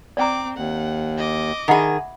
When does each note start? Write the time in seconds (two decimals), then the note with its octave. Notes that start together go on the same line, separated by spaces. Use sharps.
0.17 C4 D5 G5 A#5 D6
0.57 D#2 F#5
1.18 D#5 D6
1.68 D#3 G#4 E5 F#5 B5